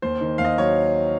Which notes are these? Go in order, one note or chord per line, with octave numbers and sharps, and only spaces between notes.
D#2 C5
D#3
D#2 F5
D#5
F#3 C#5